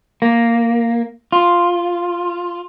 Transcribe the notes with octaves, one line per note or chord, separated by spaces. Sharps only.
A#3
F4